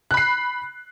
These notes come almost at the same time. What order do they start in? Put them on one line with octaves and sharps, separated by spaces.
F#6 B5 C7